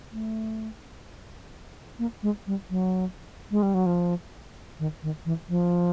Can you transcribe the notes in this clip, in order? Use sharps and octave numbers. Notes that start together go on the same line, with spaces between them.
A3
A#3
G#3
G3
F#3
G#3
G3
F#3
F3
D#3
D#3
E3
F3